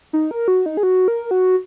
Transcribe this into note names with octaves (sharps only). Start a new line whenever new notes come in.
D#4
A#4
F#4
D#4
G#4
F#4
A#4
F#4